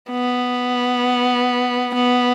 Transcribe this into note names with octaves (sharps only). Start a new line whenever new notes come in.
B3
B3